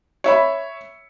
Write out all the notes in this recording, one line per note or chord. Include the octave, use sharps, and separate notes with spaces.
C#5 E5 B5